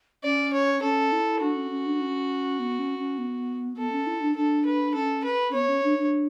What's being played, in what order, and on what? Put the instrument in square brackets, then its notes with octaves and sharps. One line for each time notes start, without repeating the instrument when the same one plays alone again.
[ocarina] C#4 [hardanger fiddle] D5
[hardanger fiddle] C#5
[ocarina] C#4 [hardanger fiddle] A4
[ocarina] E4
[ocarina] D4 [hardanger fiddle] F#4
[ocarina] C#4
C#4
D4
C#4
B3
C#4
C#4
B3
[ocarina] B3 [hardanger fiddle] A4
[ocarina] C#4
E4
D4
[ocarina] D4 [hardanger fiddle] A4
[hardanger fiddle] B4
[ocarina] C#4 [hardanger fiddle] A4
[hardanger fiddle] B4
[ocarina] C#4
[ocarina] B3 [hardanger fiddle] C#5
[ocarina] C#4
D4
D4